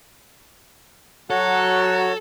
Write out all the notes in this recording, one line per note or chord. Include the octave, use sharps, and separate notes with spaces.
F#3 F#4 A4 C#5 F#5